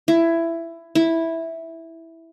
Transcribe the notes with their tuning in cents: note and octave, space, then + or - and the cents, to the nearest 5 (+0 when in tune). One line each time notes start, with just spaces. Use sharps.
E4 +15
E4 -5